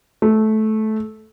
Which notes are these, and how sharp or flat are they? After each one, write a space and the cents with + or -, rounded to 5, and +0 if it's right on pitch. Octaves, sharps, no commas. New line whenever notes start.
A3 -15